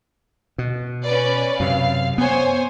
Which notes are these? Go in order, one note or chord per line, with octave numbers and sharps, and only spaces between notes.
B2
C#4 B4 D5
F#2 C3 F5
B3 C5 C#5 G#5